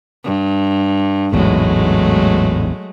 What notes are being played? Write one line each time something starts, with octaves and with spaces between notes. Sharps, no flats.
G2
A1 E2 G#2 F#3 G#3 A3